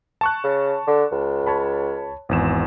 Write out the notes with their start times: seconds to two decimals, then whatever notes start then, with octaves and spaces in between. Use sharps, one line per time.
0.21 A5 C#6 F#6
0.44 C#3
0.87 D3
1.11 C#2
1.47 C#5 A5 B5
2.29 G#1 E2 E7